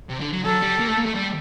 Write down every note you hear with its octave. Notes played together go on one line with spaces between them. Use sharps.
C3
D3
F#3
F#3 A4
G3
A#3
A3
A#3
A3
G3